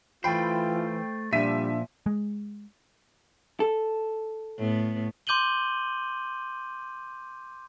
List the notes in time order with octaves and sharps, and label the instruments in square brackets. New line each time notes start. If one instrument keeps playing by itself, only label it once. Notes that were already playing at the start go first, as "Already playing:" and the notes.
[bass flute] E3 [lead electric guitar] A3 C5 [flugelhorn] F4 [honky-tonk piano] G5 B5
[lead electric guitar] A#2 F3 [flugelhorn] G3 [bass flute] D4 [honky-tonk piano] E5 B6 D#7
[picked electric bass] G#3
[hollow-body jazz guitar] A4
[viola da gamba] A2 B3
[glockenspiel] C6 D6 G6 D#7 F#7 G7